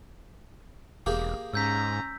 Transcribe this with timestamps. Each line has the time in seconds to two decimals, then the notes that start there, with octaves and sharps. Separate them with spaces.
1.06 E1 A#3 G4 G#4
1.54 G#2 C#4 A#5 E6 G6 B6